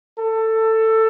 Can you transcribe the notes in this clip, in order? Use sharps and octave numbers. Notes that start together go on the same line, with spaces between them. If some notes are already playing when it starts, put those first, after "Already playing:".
A4